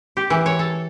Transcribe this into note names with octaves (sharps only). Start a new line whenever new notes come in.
G4
E3
C#5
A4